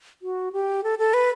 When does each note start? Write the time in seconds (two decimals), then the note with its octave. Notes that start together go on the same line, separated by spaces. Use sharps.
0.22 F#4
0.53 G4
0.83 A4
0.99 A4
1.14 B4